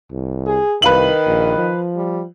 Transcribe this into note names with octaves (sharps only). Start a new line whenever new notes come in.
C2
G#4
C2 D#3 B4 F5 F#7
A#1
F3
G3